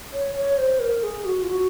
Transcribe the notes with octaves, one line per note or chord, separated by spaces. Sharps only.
C#5
C#5
C5
A#4
G#4
F#4
F4
F#4